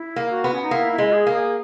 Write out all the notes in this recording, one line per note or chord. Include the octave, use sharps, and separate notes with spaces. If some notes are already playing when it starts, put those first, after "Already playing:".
Already playing: E4
A#3
F#4
B3
C#4
D#4
A#3 E4
E4
G#3
G#4
A#3
G#4